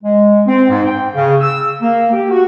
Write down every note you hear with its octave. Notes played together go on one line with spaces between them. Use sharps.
G#3
C4
G#2
G5
C#3
E6
A#3
G4
F#4